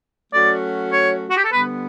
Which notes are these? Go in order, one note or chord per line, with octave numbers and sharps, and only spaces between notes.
F#3 A3 C#4 F#4 D5
C#5
F#4
G4
A4
D3 G3 B3 B4